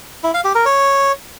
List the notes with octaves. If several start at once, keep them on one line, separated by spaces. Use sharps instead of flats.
E4
F5
G4
A#4
C#5